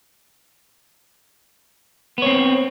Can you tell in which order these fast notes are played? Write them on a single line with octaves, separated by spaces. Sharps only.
B3 C#5 C4